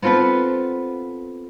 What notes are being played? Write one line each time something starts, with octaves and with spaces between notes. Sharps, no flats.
B3 C4 F4 A4 B4